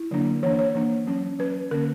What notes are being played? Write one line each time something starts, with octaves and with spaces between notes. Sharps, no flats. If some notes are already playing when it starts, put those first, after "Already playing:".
Already playing: E4
D3 F#3 A#3 D4
E3 A#3 D4 C#5
C#5
E3 A#3 D4
F#3 C#4
F#3 C#4 B4
D3 A#3 C#4 A#4